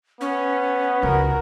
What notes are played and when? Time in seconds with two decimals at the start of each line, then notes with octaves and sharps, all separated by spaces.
0.21 B3 C#4
1.03 C#2 F#4 A#4